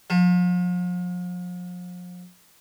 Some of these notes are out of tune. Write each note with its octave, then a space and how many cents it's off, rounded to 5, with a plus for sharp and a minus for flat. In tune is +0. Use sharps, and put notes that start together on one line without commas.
F3 +40